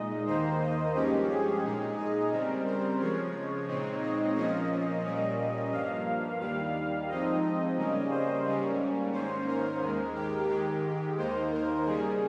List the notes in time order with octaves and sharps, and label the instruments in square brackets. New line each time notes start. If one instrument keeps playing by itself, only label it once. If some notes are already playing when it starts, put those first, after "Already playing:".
Already playing: [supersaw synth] A#2 G#3 D#4 D#5
D#2 D#3 A#3 D#4 C5
D#5
G2 F3 G#3 C#4 G4
G#4
A#2 G#3 D#4
D#5
C#3 G3 C4 A#4
C5
C#3 F3 G#3 C#5
A#2 G#3 C4 D#4
D#5
A#2 F3 A#3 C#4 D#5
A#2 G3 A#3 C#4
G2 F3 A#3 F5
D#2 D#3 G3 F5
G#2 F3 C4 D#4 D#5
C#3 G3 A#3 C#4
C5
G#2 G3 A#3 C#4
G#2 D#3 A#3 C#4 C5
A#4
D#2 D#3 G#3
G4
G#2 D#3 G#3 G4
D#2 D#3 A#3 D#4 C5
A#4
C#3 G3 A#3 G#4